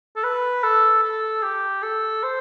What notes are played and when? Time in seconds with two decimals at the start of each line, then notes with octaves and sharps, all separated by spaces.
0.16 A4
0.23 B4
0.63 A4
1.03 A4
1.43 G4
1.82 A4
2.23 C5